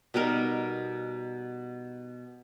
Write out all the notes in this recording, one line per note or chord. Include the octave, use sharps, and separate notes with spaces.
B2 G3 D#4 A#4